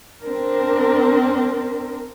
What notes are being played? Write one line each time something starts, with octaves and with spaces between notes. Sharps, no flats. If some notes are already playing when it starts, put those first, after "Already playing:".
C4 D4 A#4